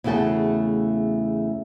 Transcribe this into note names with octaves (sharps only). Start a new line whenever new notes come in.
E2 C#3 A3 F#4 G5 A5